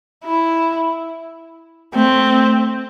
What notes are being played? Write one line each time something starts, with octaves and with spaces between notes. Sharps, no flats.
E4
A3 C4